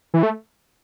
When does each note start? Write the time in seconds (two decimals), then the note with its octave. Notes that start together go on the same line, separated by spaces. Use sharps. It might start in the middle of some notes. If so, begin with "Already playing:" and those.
0.14 E3
0.23 A3